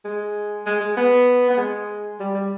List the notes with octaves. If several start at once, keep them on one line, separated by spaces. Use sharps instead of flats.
G#3
G#3
G#3
B3
B3
G#3
G3
G3